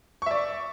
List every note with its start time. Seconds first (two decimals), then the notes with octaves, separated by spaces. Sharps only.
0.22 C#6
0.26 E5
0.31 D5